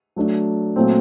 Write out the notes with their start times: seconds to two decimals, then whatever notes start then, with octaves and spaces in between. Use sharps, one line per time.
0.16 F#3 A3 D4
0.76 A#2 F#3 A3 C4